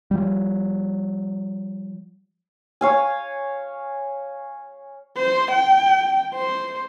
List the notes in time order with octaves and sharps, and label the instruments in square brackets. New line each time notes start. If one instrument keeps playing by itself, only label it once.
[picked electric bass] F3 G3
[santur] C#5 F5 G#5
[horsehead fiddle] C5
G5
C5